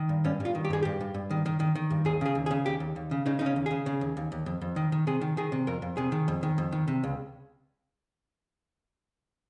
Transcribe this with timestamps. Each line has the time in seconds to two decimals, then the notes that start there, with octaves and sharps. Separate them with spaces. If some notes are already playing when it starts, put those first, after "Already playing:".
Already playing: D#3
0.09 G2
0.25 G2 C#4
0.40 G2 F4
0.55 D#3
0.65 G4
0.70 G2 G#4
0.83 G2 G4
1.01 G2
1.14 G2
1.31 D#3
1.46 D#3
1.60 D#3
1.75 D#3
1.90 G2
2.05 D#2 G#4
2.21 C#3 G#4
2.35 D#2
2.46 G#4
2.51 C#3
2.66 D#2 G4
2.80 D#2
2.96 D#2
3.11 C#3
3.26 C#3 D#4
3.39 C#3 D#4
3.46 C#4
3.56 D#2
3.66 C#3 G#4
3.86 C#3
4.01 D#2
4.17 D#2
4.32 D#2
4.46 F2
4.61 F2
4.76 D#3
4.92 D#3
5.07 C3 G#4
5.21 D#3
5.37 D#3 G#4
5.52 C3
5.67 F2 A#4
5.82 F2
5.97 C3 G#4
6.12 D#3
6.28 F2
6.43 D#3
6.58 F2
6.72 D#3
6.88 C3
7.04 C#2